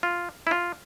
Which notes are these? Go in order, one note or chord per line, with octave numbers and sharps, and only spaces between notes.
F4
E4
F4